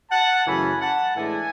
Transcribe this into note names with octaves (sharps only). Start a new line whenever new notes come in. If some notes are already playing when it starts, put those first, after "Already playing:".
F#5 A5
F#2 C#3 E3 A3 C#4 G#5 B5
F#5 A5
A2 E3 G#3 D4 E5 G#5